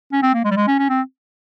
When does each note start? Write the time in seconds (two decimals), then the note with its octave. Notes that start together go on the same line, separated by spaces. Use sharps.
0.12 C#4
0.22 C4
0.34 A#3
0.45 G#3
0.51 G3
0.57 G#3
0.68 C#4
0.79 C#4
0.89 C4